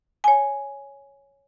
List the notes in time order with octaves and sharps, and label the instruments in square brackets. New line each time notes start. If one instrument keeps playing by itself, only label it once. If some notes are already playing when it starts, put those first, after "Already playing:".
[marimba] C#5 G#5